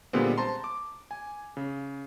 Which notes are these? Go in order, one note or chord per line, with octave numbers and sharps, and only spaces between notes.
A#2 D3 G3 G#3 B3 C4
C5 A5 A#5 C6
D6
G#5
C#3